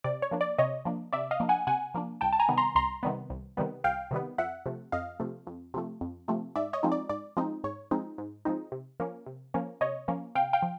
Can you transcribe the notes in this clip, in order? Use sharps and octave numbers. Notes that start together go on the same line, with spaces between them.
C3 D5
C#5
F3 A#3 D4
D5
C3 C#5 D#5
F3 A#3 D4
C3 D5 E5
D#5 F5
F3 A#3 D4
F#5 G#5
C3 F#5 G#5
F3 A#3 D4
C2 G5 A5
A5
G#5 A#5
C3 D#3 G3 B3
A#5 C6
C2 A#5 C6
C3 D#3 G3 B3
C2
C3 D#3 G3 B3
C2 F5 G5
C3 D#3 G3 B3
F2 E5 F#5
C3 F3 A3
F2 D#5 F5
C3 F3 A3
F2
C3 F3 A3
F2
C3 F3 A3
G#2 D5 E5
C#5 D#5
F3 G#3 C4 D#4
D5
G#2 D5
F3 G#3 C4 D#4
G#2 C#5
F3 G#3 C4 D#4
G#2
F3 G#3 C4 D#4
C3
F3 A#3 C#4
C3
F3 A#3 C#4
C3 C#5 D#5
F3 A#3 C#4
C3 F5 G5
F5 G5
F3